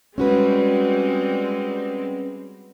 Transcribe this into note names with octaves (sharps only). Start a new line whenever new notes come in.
G3 G#3 C4 C#4 F#4 B4